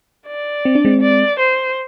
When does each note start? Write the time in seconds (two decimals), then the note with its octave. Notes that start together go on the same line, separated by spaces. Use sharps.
0.27 D5
0.65 C4
0.75 D4
0.85 G#3 C4
1.01 D5
1.39 C5